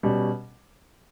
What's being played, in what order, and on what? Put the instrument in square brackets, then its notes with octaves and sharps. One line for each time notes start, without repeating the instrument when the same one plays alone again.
[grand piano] B2 G3 C#4